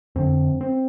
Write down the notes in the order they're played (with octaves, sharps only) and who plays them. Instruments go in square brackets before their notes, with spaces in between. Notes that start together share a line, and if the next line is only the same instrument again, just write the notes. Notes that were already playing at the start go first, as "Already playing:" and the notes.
[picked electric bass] F2 D3 C4
C4